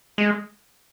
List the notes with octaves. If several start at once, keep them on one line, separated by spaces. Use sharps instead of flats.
G#3